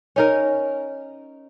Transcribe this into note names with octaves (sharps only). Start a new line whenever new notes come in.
C#4 D#4 A#4